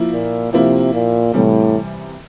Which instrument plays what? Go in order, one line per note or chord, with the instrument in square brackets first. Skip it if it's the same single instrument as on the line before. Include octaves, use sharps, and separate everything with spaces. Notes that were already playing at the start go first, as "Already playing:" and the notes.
Already playing: [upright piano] F3 A#3 E4
[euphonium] A#2
[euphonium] C3 [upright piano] F3 A#3 E4
[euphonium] A#2
[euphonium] A2 [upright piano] C3 E3 G3